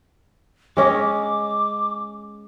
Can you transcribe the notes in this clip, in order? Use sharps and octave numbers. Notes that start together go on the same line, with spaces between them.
G#3 C#4 D#5 D6